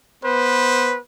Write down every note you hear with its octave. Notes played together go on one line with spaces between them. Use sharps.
B3 B4 C5